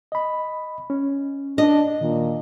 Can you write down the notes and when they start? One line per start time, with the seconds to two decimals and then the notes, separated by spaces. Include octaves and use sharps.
0.12 D#5 B5
0.90 C#4
1.58 D4 D#5
2.01 A#2 D#3